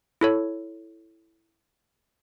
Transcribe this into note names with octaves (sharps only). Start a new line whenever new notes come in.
E4 A4 C#5